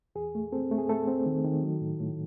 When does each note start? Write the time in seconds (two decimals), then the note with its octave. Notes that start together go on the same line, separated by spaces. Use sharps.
0.15 E2 G#4
0.35 A3
0.52 C4 A4
0.71 A3
0.78 G#4
0.89 A3 A4
1.08 C4
1.26 D#3
1.45 D#3
1.62 F#3
1.81 A2
2.00 A2